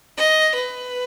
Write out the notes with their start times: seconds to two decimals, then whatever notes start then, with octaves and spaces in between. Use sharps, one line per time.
0.17 D#5
0.55 B4